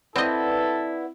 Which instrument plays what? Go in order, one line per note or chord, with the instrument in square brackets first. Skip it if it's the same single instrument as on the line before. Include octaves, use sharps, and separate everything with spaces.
[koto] C4 D#5 [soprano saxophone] E4 [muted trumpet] A4 [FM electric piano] B4 D5 F#5